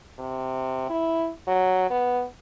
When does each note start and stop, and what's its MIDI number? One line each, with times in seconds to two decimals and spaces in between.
0.19 0.88 48
0.90 1.29 64
1.47 1.90 54
1.90 2.24 59